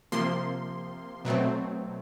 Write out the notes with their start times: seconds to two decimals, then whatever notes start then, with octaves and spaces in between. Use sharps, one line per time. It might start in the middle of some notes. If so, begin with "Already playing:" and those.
0.12 C3 F3 A#3 C6
1.25 B2 F#3 A3 C4